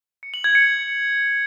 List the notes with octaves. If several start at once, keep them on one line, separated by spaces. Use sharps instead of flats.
C#7
F#7
G#6
C#7